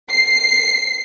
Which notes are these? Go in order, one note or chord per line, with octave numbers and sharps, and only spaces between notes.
C7